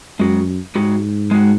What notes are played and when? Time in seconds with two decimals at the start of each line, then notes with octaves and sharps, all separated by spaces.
0.20 F#2 G#3 F#4
0.75 G#2 G#3 F#4
1.31 G#3 F#4